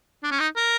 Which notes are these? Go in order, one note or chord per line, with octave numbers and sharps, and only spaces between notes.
D4
C#4
D#4
A#4